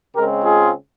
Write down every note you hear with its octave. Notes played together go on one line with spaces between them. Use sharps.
C#3 G#3 C4 G4 A#4
F4 G#4